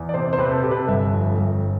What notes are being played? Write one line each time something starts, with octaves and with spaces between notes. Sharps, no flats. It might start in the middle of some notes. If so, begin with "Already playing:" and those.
Already playing: E2
D5
C3 C5
C5
C3 B4
A4
C3 G4
B4
A4
G1 E5
F2
G1